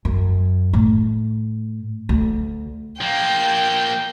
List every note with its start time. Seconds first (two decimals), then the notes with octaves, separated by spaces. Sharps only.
0.05 F#2
0.73 A2
2.09 D2
3.01 F3 A#3 G5